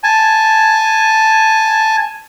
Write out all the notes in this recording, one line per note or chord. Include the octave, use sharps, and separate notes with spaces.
G#5 A5